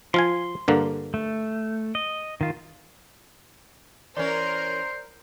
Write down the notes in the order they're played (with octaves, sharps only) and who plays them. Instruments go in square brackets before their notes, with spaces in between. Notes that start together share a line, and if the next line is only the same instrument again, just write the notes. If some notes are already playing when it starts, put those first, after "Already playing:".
[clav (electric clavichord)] F3 F4 G#5 [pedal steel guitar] C6
[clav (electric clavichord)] G2 D3 A#3
[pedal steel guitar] A3
D#5
D#3 F4
[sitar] E3 C#4 [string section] A#4 [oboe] C5 [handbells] D5 C6